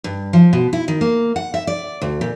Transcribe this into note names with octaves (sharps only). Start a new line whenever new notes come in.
G2
F3
B2
E4
D#3
A#3
F#5
E5
D5
D2
A#2